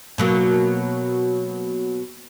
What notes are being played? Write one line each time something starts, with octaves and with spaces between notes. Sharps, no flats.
B2 F#3 A#3